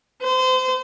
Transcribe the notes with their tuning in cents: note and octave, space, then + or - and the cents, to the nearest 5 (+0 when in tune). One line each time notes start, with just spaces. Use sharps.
C5 -30